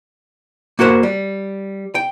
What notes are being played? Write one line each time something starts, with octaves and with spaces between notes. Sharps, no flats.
A#3 F#4 A#4 C5 F#5
G3
G5